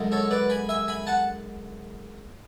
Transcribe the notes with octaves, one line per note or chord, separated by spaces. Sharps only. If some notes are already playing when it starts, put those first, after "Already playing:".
Already playing: F#2 D3 G#3
A4 C#5
B4 D5
G#5 B5
E5 G#5
G#5 B5
F#5 A5